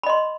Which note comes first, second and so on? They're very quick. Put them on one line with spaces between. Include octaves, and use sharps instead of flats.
B5 D#5 C6